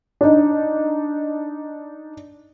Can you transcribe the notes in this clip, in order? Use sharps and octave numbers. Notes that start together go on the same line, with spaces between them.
D4 D#4